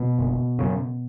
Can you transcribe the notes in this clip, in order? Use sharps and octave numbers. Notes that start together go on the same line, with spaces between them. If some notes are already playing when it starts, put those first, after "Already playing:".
Already playing: B2 B3
F#1
F#2 C#3